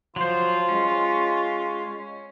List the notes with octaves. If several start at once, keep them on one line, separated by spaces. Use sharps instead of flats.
F3 F#3 F4 C5
G#3 C#4